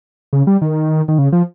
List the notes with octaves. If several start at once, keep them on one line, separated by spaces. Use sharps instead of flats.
C#3
G3
D#3
D#3
C#3
F3